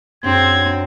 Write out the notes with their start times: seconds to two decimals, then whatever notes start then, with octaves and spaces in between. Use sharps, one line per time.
0.24 F#2 C4 D4 G#6